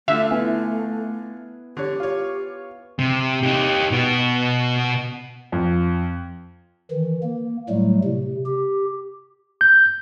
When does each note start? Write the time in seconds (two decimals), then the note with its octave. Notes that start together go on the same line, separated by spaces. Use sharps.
0.08 D3 A3 F4 E5
0.31 B3 E4 G#5
1.77 D3 G4 C#5
2.00 F4 C#5
2.99 C3
3.43 D#4 G4
3.91 B2 F#4
5.52 F2
6.91 D#3 E3
7.23 A#3
7.69 A2 F#3 G3 A3
8.04 C3
8.46 G4
9.61 G6